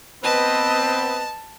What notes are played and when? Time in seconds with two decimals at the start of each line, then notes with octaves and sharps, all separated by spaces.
0.24 B3 C4 B4 D#5 A5